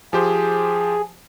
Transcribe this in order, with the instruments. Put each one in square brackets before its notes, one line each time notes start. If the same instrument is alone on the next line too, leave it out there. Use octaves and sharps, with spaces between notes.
[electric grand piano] F3 G4 C5 [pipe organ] G#4